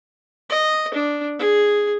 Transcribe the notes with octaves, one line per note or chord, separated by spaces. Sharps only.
D#5
D4
G#4